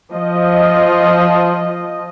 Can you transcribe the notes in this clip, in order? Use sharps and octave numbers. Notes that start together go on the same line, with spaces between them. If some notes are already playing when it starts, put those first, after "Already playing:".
F3 D#5